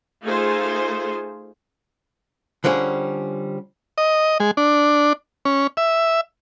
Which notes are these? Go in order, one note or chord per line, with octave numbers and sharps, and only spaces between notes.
A3 D#4 F4 G#4 C5
D3 F3 G3 C#4 G#4
D#5
G#3
D4
C#4
E5